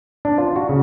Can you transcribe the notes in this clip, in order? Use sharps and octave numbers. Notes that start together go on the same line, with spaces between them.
D4
F4
F#4
C#3